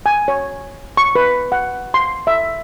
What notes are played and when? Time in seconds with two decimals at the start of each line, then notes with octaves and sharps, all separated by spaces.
0.06 G#5
0.28 C#5
0.97 C#6
1.15 B4
1.52 F#5
1.94 C6
2.27 E5